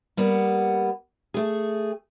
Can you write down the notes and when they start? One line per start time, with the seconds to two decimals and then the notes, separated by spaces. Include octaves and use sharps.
0.17 G3 A#3 B3
1.34 A3 G#4